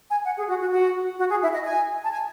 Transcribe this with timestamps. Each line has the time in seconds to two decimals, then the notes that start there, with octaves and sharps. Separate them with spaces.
0.09 G#5
0.25 F#5
0.36 G#4
0.48 F#4
0.60 F#4
0.71 F#4
1.18 F#4
1.29 G#4
1.41 E4
1.53 D#5
1.64 G#5
2.02 A5
2.11 G#5